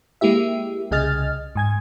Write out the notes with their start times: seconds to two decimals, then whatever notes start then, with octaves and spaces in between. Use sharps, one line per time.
0.21 G#3 A#3 E4 G4 E5
0.91 C2 C#3 G#4 D#5 F6 A6
1.55 G#2 G#5 G#6